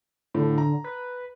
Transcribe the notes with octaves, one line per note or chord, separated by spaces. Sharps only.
A2 D3
A#5
B4